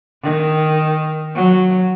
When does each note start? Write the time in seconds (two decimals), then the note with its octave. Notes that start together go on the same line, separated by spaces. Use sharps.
0.23 D#3
1.35 F#3